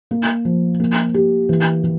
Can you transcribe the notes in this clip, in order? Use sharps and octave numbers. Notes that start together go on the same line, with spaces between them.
A#3
F3
A#3
G4
E3
E3